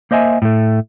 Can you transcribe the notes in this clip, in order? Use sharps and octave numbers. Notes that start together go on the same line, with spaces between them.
A#3 C5 D#5 E5 G#5
A2 A3